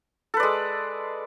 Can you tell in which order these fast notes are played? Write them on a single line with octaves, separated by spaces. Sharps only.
A4 B4 D5 G#3